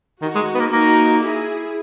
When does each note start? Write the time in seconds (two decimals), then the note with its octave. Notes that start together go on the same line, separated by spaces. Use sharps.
0.22 D#3 D#4 F#4
0.35 G#3
0.54 B3
0.59 A#3
0.72 A#3 D#4 F#4
1.23 E4 G#4